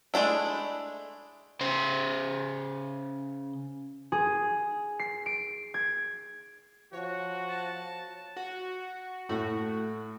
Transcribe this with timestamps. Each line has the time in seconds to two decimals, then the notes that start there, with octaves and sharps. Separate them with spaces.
0.14 G#3 A3 D4 E4
1.61 C#3 C5
4.12 G#4
4.99 C7
5.26 D7
5.74 G#6
6.93 F3 F#4 C#5
7.49 A5
8.36 F#4
9.29 A2 A3 F#4